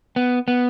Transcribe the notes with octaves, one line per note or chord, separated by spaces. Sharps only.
B3
B3